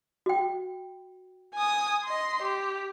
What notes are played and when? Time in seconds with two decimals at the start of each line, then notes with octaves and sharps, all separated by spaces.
0.26 F#4 G5
1.54 G#5 D#6
2.04 D#5 C6
2.42 G4